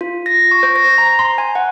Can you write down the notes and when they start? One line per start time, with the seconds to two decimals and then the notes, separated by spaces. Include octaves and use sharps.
0.01 F4
0.26 A#6
0.51 C#6
0.63 C5
0.76 A#6
0.98 A#5
1.19 C6
1.38 G#5
1.55 F#5